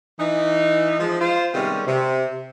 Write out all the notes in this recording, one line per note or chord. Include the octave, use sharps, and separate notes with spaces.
E3 D#4
F3 G#3
F4 C5
C3 D#3 G3 G#3 B3 C#4
C3